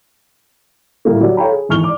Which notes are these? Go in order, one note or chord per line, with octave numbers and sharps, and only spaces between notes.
A2 G3 A#3
F#3 G4 D5
A4 C#5 F5 G5 A#5 B5
G#4
G#1 E2 C#6 F6 F7 G7
D5 D6